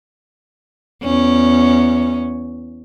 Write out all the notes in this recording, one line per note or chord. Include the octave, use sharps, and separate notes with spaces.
E2 C#4